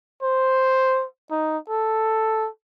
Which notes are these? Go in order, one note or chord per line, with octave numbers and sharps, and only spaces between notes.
C5
D#4
A4